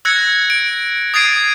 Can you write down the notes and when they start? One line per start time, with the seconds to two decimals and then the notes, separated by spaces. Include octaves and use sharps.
0.05 E6 F#6 G#6 A#6 C#7
0.50 D7
1.14 D#6 G#6 A6 C7 D7 D#7